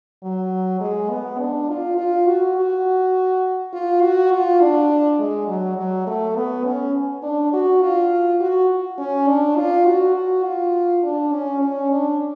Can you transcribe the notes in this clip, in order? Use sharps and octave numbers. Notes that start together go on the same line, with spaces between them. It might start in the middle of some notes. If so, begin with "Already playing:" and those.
F#3
G#3
B3
D4
F4
F4
F#4
F#4
F4
F#4
F4
D4
G#3
F#3
F#3
A3
B3
C#4
D4
F#4
F4
F#4
C#4
D4
F4
F#4
F#4
F4
D4
C#4
C#4
D4